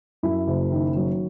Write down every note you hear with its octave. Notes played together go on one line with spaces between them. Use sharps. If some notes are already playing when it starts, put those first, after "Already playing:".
F#2 E4
F#1
D#3
F#3